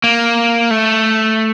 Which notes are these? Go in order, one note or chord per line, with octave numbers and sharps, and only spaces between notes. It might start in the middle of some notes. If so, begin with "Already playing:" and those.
A#3
A3